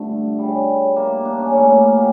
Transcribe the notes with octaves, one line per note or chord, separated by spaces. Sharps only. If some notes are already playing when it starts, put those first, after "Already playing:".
Already playing: G2 D3 F3 A3
C#3 G3
A#3
D4
C#4
A2 F3 C#4
A#3
A#3
G4